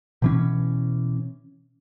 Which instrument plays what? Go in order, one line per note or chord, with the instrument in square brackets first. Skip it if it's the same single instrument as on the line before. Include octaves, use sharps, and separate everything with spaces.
[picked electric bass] B2 E3 C#4